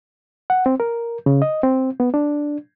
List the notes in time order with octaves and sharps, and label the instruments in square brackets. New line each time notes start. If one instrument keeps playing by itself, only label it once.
[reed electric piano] F#5
C4
A#4
C#3
D#5
C4
B3
D4